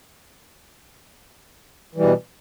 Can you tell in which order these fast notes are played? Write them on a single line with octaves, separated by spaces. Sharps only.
E3 G3 B2